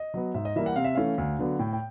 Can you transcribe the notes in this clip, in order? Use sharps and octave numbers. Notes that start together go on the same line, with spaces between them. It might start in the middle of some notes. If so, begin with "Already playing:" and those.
Already playing: D#5
F#3 B3
G#2 E5
D#5
E3 G3 A#3 E5
F#5
C3 F5
E5
E3 A3 C#4 F5
D2
D3 F#3 B3
A2 G5
G5